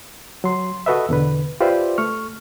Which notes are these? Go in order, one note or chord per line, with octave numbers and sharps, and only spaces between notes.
F#3 C6
F#4 A4 B4 D#5 E5
E2 B2 D3 B4
F4 G4 B4 C5 D5 E5
A3 C#6 F6